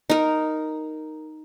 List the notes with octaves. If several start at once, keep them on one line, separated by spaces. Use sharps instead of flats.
D#4 A#4